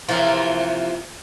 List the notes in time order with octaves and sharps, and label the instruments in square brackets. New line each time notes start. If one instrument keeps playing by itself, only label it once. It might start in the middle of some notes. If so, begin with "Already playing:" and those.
[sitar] C3 E3 [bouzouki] F3 A#3 F4